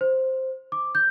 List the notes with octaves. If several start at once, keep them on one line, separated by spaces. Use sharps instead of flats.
C5
D6
G6